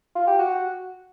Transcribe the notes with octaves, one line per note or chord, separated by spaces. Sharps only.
F4
G4
F#4